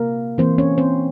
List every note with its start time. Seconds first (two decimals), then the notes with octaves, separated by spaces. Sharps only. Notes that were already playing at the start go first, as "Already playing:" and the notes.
Already playing: C3 A#3 A#4
0.38 E3 A#3 C4 C5
0.58 C#4 C#5
0.78 C4 C5